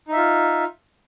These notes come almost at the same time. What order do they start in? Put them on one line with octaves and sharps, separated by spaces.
D#4 E5 F4